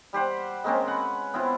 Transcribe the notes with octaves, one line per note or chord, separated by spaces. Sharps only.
G3 G4 C5 F#5
G#3 A#3 C4 C#4
B4 F#5
B3 C4 E4 F4